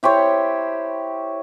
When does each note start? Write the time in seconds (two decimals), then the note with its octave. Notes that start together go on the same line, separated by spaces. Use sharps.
0.03 E4 G4 C5 C#5